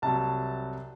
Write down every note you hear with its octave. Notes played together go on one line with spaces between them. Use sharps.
C2 C3 F#3 A5